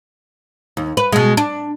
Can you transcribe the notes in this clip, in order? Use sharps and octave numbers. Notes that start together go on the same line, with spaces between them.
D#2
B4
B2 G#3
D4